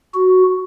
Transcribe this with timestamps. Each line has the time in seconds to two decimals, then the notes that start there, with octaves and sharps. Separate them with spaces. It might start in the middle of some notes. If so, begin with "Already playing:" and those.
0.14 F#4